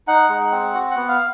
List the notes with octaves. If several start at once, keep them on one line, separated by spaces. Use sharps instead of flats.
D#4 F#5
G#3
C4
F#4
F#5
B3
F5